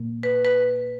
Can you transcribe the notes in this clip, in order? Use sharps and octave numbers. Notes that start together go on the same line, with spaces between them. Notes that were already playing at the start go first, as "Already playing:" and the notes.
Already playing: A#2 A#3
B4
B4